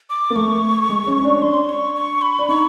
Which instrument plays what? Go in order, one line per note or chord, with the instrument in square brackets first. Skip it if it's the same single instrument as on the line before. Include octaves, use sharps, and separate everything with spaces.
[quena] D6
[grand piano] A#3
[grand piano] A3 [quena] C#6
[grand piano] G#3
C#4
C#4
D4
[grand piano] D4 [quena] C6
[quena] C#6
C#6
B5
[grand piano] D4
[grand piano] D#4 [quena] C#6